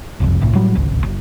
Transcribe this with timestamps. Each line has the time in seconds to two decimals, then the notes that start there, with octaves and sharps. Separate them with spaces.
0.20 F#1 C2 F2
0.40 G1 C2 A2
0.55 A2 F#3 G3
0.75 D1 G#1 C#2
1.04 F#1